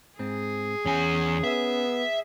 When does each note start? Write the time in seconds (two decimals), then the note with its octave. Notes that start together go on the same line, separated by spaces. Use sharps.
0.19 G#2 C4 G#4
0.85 E2 C#4 G#5
1.44 B3 E5